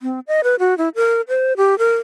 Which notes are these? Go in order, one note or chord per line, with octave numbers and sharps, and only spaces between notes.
C4
D#5
B4
F#4
E4
A#4
C5
G4
A#4